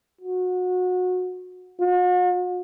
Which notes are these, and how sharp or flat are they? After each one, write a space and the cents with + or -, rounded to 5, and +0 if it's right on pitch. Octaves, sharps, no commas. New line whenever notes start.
F#4 -25
F#4 -45